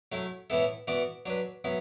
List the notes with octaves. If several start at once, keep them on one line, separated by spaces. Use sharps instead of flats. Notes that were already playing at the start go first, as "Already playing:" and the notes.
F#3 A3 E4
A2 E3 B3 E4 A4
E3 B3 F#4 D5
F#3 D4 B4
F#3 B3 E4